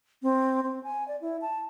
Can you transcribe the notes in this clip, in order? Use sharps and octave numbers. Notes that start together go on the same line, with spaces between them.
C4
C4
G#5
D5
E4
A5